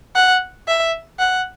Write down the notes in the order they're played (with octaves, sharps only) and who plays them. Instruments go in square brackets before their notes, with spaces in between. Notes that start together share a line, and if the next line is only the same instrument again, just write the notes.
[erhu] F#5
E5
F#5